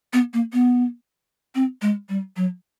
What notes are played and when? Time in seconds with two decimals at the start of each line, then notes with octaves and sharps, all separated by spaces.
0.13 B3
0.34 A#3
0.53 B3
1.55 C4
1.82 G#3
2.09 G3
2.36 F#3